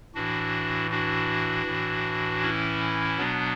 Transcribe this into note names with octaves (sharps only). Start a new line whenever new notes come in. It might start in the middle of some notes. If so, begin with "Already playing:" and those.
A2 E3 D4 F#4
D4 F#4
A2 E3
C#4 E4
B2 F#3 B3 D4